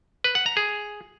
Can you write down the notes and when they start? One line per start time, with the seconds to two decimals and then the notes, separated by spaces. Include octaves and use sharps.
0.24 B4
0.35 F#5
0.46 A#5
0.57 G#4